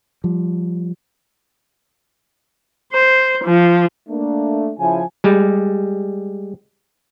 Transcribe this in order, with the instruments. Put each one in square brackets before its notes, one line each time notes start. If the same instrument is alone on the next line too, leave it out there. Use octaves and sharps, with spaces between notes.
[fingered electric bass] F3 G3
[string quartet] C5
F3
[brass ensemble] A3 A#3 D4
C#3 F3 E4 G#5
[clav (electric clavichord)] G3 G#3